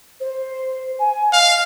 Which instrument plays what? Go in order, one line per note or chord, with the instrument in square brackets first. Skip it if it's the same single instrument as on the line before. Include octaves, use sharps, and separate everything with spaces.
[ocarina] C5
G#5
[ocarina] D#5 [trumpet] F5